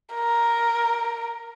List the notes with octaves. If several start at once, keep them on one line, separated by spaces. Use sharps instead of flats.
A#4